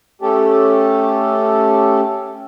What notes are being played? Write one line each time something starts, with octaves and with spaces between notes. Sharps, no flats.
A3 C#4 G4 A4